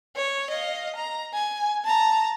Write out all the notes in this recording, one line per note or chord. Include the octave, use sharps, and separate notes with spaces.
C#5
D#5 F5
A#5
G#5
A5 A#5